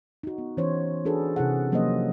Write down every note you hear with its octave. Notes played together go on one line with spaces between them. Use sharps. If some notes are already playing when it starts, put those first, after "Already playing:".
D#4 F#4
B3
E3 C#4 C5 C#5
D4 F#4 G#4 A4 B4
C3 C#4 E4 G#4 F#5
F3 F#3 A#3 C#4 C5 D#5